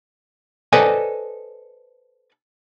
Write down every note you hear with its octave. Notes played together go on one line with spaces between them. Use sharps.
A4 B4 C5 D5 D#5 G#5